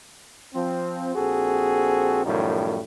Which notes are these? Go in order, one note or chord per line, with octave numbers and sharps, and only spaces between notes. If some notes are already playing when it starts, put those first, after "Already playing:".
F3 C4
A#1 C4 F#4 G#4 A4
F#2 A2 D#3 F3 G3